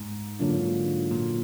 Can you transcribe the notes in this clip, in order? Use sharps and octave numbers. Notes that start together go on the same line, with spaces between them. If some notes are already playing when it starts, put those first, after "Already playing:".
Already playing: G#2
D3 F#3 A#3 D4 F4
A#2